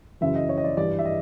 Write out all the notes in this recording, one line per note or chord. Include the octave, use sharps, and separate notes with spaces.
F#2 C#3 E3 E5
D#5
C#5
D#5
D5
G2 E3 D5
E5
D#5